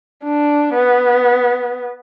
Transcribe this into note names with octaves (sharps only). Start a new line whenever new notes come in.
D4
B3